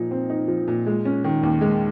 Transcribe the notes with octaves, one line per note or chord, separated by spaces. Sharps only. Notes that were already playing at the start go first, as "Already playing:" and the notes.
Already playing: A#2 F3 D#4
C4
D#4
F3
A#2
G#3
C#4
D#3
D#2
G#3